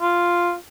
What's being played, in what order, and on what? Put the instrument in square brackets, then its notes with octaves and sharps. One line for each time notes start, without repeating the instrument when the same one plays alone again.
[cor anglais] F4